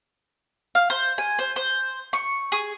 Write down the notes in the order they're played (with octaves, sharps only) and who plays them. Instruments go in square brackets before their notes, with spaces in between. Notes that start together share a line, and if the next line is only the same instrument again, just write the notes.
[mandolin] F5
C5
G#5
C5
C5
C#6
G#4